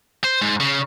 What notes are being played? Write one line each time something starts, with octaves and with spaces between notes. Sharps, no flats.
C5
G#2
C#3